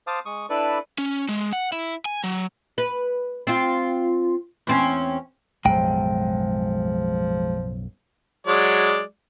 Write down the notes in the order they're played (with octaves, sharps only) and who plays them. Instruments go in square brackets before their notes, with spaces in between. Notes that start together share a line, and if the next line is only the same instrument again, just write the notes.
[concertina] C5 F5 A5 D6 D#6
G#3 C#6 D#6
D4 E4 A4 B4 D5
[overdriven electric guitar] C#4
G#3
F#5
E4
G#5
F#3
[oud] B4
C4 F4
E2 C4 C#4
[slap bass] B1 F#2 A2 [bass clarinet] F3 [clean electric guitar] G#3 G5
[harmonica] F#3 G#3 D5